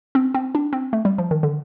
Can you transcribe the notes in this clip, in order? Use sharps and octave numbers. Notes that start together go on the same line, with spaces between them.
C4
C4
D4
C4
A3
G3
F3
D#3
D3